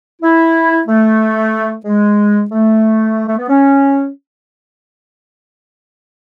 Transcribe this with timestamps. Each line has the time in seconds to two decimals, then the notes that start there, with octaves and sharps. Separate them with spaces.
0.22 E4
0.88 A3
1.85 G#3
2.51 A3
3.27 A3
3.38 B3
3.49 C#4